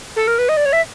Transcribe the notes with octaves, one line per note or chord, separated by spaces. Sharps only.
A4
A#4
B4
D#5
D5
C#5
E5